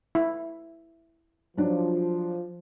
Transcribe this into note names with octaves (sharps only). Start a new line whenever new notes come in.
E4
F3 F#3 D4